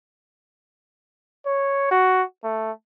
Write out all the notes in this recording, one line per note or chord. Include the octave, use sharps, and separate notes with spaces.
C#5
F#4
A3